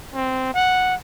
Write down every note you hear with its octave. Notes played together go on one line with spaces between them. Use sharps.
C4
F#5